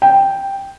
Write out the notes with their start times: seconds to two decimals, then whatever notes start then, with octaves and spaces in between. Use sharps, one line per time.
0.02 G5